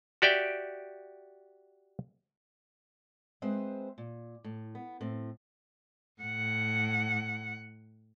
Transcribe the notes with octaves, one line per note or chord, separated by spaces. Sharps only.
F#4 G4 D5 E5 G5
G#3 C4 B4 C5 E5
A#2
A2
B3
A2 C4
A2 F#5